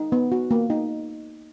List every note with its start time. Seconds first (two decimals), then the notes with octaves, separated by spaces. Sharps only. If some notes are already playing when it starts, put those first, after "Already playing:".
Already playing: D#4
0.12 B3
0.32 F#4
0.51 A#3
0.70 D#4